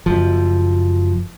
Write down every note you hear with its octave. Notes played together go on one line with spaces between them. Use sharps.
F#1 F3